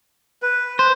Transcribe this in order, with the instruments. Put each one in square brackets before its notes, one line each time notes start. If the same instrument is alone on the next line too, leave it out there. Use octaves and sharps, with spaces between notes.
[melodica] B4
[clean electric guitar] C5